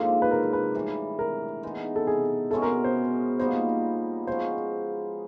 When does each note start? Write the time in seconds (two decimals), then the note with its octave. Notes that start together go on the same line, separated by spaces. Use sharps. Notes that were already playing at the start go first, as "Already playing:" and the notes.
Already playing: G#2 F3 A#3 D4 A4
0.22 B4
0.31 A#4
0.53 B4
0.75 A2 E3 G3
1.19 A#4
1.63 E3 G#3 B3 D#4
1.96 A4
2.07 G#4
2.51 B2 G#3 C#4 E4 A4
2.62 A#4
2.84 C5
3.40 A#2 G3 B3 D#4 C5
4.27 F3 G#3 C#4 F#4 C5